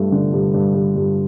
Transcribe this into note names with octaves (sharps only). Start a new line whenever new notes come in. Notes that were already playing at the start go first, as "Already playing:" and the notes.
Already playing: G2 A3
D3
G2
G2
G2
G2